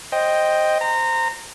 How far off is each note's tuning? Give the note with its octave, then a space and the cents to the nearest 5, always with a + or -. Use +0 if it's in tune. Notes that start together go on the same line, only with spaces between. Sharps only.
C5 +5 D#5 +0 G5 +0
C5 -10 A#5 -20